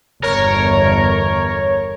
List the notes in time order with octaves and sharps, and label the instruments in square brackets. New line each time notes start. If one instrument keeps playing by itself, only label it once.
[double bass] G1 E2 [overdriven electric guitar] A#4 [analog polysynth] C#5